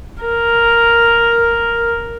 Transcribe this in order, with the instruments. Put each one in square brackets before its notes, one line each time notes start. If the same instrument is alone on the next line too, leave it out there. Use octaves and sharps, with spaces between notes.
[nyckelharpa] A#4